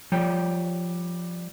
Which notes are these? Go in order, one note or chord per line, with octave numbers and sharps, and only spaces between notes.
F3 G3 C#5 G5